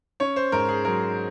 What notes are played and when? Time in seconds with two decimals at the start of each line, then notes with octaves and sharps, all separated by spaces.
0.20 C#4 C#5
0.36 C5
0.52 G#2 A#4
0.69 G#4
0.85 F#3 A#4